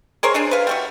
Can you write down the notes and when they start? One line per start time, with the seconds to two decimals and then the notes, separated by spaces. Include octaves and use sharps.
0.23 G#4 A#4 C5 C#5
0.34 D4 G#4 A4
0.51 B4 F5
0.67 G3 A3 F#4